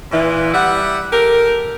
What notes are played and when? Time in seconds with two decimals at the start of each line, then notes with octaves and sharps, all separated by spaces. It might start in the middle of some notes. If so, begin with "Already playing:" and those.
0.12 A#2 E3
0.54 G3 E5 F#5
1.12 G4 A4 A#4